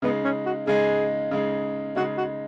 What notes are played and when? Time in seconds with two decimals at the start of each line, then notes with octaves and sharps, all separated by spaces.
0.02 C#3 G#3 B3 D#4
0.24 C#4
0.45 F#4
0.67 C#3 G#3 D#4 G#4
1.31 C#3 G#3 D#4
1.96 C#3 G#3 D#4 F#4
2.17 F#4